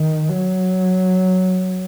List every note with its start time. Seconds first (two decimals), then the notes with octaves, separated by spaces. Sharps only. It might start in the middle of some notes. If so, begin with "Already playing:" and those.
Already playing: D#3
0.29 F#3